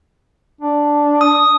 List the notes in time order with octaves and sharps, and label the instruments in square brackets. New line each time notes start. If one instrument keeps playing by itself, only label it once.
[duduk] D4
[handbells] D#6